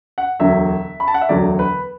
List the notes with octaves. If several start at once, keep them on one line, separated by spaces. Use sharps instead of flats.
F#5
E1 D2 D3 F#3 E5
B5
A5
F#5
E5
E1 D2 D3 F#3 D5
B4